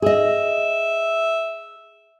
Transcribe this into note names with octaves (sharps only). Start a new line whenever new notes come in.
G#4 D#5 E5